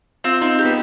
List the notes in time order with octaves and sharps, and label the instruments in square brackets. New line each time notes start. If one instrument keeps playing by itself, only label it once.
[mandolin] C4 [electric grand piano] F4
[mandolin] C4 [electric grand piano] D#4
[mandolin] G4
[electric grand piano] B3